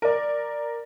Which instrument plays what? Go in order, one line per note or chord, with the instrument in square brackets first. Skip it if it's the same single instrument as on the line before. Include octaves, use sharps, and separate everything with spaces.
[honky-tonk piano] A#4 D5